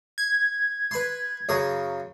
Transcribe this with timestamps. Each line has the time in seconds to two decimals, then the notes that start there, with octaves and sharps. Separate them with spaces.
0.18 G#6
0.91 B4 B5 C6
1.49 F#2 C#3 A#4